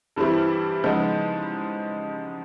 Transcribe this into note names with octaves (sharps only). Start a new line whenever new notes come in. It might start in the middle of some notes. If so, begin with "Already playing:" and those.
G2 E3 G3 C4 E4
C#3 F3 G#3 B3 D#4